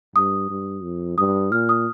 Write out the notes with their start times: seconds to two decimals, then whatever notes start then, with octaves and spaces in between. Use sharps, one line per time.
0.16 G2 D#6
0.50 G2
0.83 F2
1.18 G2 D#6
1.52 A#2 F6
1.69 D#6